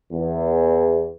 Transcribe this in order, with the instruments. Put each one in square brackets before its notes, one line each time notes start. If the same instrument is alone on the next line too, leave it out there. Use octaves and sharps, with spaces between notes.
[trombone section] E2